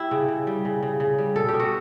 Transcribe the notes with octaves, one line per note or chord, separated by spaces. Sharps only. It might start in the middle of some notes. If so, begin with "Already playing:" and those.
Already playing: E4 G4
C#3
C#3
G3
C#3
C#3
C#3
G3
B2 A4
G4
B2
F#4